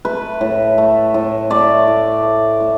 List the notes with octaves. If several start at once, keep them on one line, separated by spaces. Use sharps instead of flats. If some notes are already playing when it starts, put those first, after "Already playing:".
A3 B4
A2
A3
A2
A3 D5
A2
A3
A2